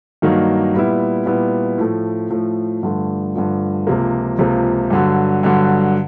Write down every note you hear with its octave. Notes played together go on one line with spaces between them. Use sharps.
G2 D#3 F#3 A#3
A#2 G3 B3 E4
A#2 G3 B3 E4
A2 F3 A3
A2 F3 A3
G2 D3 F3 A3
G2 D3 F3 A3
C#2 C3 F3 A#3
C#2 C3 F3 A#3
G2 D3 F#3
G2 D3 F#3